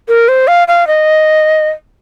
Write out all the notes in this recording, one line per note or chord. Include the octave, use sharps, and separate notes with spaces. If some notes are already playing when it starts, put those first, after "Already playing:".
A#4
C5
F5
F5
D#5